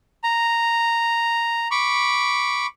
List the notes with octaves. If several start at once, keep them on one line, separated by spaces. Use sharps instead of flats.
A#5
B5 C#6 D6